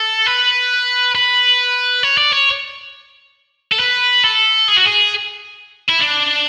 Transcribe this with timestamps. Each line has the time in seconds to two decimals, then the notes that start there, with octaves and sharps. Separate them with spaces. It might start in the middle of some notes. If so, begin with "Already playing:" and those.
Already playing: A4
0.27 B4
1.15 B4
2.03 C#5
2.17 D5
2.33 C#5
3.72 A4
3.79 B4
4.23 A4
4.68 G#4
4.77 F#4
4.85 G#4
5.88 E4
6.00 D4